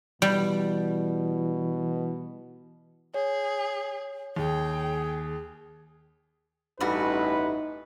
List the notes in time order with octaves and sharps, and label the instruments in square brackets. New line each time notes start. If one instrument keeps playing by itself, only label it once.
[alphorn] B2 [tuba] E3 [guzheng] G3
[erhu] G#4 [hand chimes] C#5
[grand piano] D#2 [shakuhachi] G#4 [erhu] G5
[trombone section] A1 [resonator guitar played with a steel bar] G2 G3 F#4 [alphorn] D#4 [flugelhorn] B4